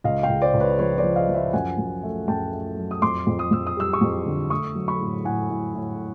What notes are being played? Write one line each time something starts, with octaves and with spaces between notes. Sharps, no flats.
C#2 D#5 F5
F5 G5
C#2
C5 D5
C#2
B4 C#5
F3 B4 C#5
C5 D5
F3
D#5 F5
F3
D5 E5
F#2 F#5 G#5
F#2
A3
F#2 G5 A5
A3
F#3
D#6
F2 C6 D6
F2
D#6
F2 E6
D#6
G3 E6
C#6 D#6
F2
D3
A3 C#6 D#6
F#3
B5 C#6
A2
A2 F#5 G#5
A2
A2